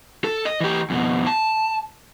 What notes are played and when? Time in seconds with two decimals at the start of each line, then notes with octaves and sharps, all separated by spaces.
0.24 A4
0.45 D#5
0.61 E3 G4
0.90 F2 B2
1.27 A5